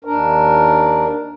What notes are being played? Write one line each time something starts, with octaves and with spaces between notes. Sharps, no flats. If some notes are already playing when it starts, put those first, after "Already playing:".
D#2 D4 A#4